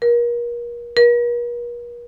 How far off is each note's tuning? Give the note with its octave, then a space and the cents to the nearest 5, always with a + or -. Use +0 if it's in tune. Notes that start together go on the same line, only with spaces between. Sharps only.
A#4 +35
A#4 +45